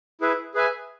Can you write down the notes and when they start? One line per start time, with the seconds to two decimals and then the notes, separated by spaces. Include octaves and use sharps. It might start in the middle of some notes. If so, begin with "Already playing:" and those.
0.21 E4 G#4 B4 E5
0.54 G#4 B4 E5 G#5